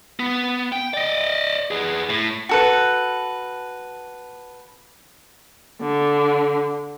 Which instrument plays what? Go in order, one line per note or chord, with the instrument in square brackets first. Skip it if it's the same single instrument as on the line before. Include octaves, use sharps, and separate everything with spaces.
[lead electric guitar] B3
G5
D5 D#5
B3 G#4
A2
[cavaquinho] F#4 A4 B4
[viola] D3